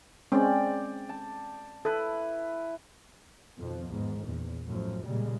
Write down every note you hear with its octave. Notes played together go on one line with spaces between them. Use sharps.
G#3 C4 C#4 D5 G5
A5
E4 A4 B4
F2 B2 D#3 F3
E2 G#2 D#3
A#1 E2
F#2 A2 F3
A#2 C#3 G3 G#3